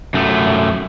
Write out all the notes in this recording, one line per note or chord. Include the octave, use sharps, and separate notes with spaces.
F#2 A3